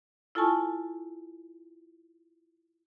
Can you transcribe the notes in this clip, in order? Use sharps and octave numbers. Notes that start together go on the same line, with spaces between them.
E4 F4 A4 G#5 A5 C#6